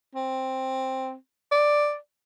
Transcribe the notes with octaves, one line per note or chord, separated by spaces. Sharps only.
C4
D5